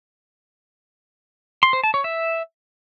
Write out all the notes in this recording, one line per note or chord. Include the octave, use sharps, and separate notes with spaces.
C6
C5
A5
C#5
E5